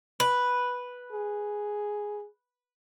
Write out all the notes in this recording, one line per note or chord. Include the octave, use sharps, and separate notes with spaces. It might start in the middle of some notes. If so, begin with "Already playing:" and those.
B4
G#4